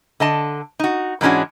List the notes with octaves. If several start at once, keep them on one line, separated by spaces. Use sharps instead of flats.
D3 D#5 A5
D#4 F#4
G#2 E3 G#3 C#4 D4 F#4